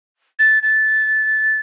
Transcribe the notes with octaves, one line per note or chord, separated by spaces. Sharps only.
A6
A6